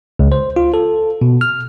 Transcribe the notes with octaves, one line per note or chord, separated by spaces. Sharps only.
C#2
C5
F4
A4
B2
F6